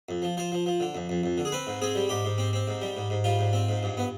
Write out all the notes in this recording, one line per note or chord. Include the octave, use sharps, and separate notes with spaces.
F2
F3
F3 C5
F3
F3
D3
F2
F2
F2
D3
G#4
C4 B4
G#2
C4 G#4
G3
G#2 G4
G#2
C4
C4
G#2
G3
G#2
G#2
G3 F4
G#2
C4
G#2
G2
B3